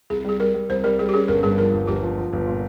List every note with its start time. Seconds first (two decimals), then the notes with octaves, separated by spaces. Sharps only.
0.10 C2 G#4
0.25 G3 G#4
0.40 G3 A#4
0.54 G3
0.69 C2 C5
0.84 G3 A#4
0.99 G3 G#4
1.09 G4
1.14 C#4 G#4
1.28 G1 A#4
1.43 G2 G#4
1.58 F3 A#4
1.73 G1
1.87 G1 G4
2.03 F3
2.18 F3
2.33 G1
2.47 A#2